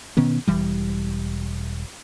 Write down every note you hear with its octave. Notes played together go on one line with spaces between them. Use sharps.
B2 D#3 B3 C#4
E1 E3 G3